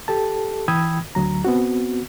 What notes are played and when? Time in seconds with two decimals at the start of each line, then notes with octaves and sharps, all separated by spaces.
0.08 G4 A4 A5
0.68 E3 G5 B5 D#6 E6 G#6
1.15 D2 F#3 A#5
1.45 B3 C4 F#4